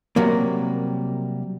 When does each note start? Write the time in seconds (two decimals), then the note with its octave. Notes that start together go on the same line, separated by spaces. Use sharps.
0.16 C3 F#3 G3 A#3